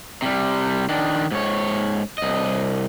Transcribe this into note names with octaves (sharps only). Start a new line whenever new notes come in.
C3 G3
D#3 D4
G#2 C#5
C2 D#5